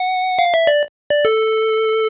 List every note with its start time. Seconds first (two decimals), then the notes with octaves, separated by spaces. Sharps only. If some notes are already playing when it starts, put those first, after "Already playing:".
Already playing: F#5
0.39 F5
0.54 E5
0.67 D5
1.10 D5
1.25 A4